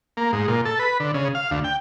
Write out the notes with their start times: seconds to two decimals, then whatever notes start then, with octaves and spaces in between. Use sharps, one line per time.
0.17 A#3
0.33 G#2
0.48 A#2
0.65 A4
0.79 B4
1.00 D3
1.14 C#3
1.35 F5
1.51 D2
1.64 G5